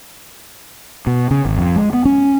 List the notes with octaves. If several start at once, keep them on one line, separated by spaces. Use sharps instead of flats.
B2
C#3
G#1
F2
G#3
B3
C#4